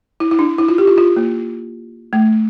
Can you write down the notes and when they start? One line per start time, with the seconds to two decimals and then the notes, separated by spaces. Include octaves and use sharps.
0.20 E4
0.31 E4
0.39 D4
0.58 E4
0.68 F4
0.78 G4
0.87 F4
0.98 F4
1.16 A#3
2.13 A3